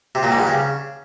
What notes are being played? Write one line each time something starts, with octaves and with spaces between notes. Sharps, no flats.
C3
A#2
G#2
G2
C#3